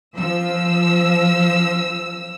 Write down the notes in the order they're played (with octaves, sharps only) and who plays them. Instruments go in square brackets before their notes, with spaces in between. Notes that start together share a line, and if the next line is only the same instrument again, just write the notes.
[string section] F3 E6